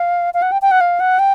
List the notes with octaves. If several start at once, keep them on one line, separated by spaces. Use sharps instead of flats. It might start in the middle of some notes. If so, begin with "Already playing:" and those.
Already playing: F5
F5
F#5
G5
G5
F#5
F5
F#5
G5